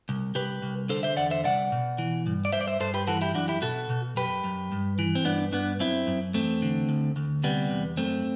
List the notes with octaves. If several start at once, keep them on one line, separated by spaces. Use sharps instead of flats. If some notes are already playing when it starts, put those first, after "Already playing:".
C2
C2 G4 B4
C2
D3 A4 C5
C5 E5
E2 D5 F#5
C5 E5
C2 D5 F#5
B2
E3
G2
D5
G2 C5 E5
D5
C5 E5
G2 A4 C5
G4 B4
E3 F#4 A4
E4 G4
F#2 D4 F#4
E4 G4
B2 F#4 A4
B2
F#2 G4 B4
F#2
G2
E3
C4
G2 B3 D4
G2 B3 D4
F#2 C4 E4
F#2
E2 A3 C4
D3
D2
D2
C3 G3 B3
E2
F#2 A3 C4